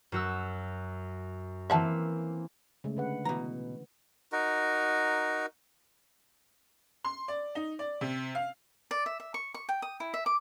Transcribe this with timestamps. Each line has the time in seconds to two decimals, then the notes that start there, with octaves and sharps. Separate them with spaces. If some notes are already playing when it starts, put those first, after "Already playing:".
0.12 F#2 F#4 E6
1.70 E3 A#3 C4 E5 F#5 A5
2.84 C#3 G#3 A3
2.97 D3 B4 F#5
3.25 B2 E3 A#5
4.32 D#4 F#4 A#4
7.05 C6
7.28 D5
7.55 D#4
7.79 D5
8.01 C3
8.35 F5
8.91 D5
9.06 E5
9.20 E5
9.34 C#6
9.54 C#6
9.69 G5
9.82 D#6
10.00 E4
10.14 E5
10.26 D6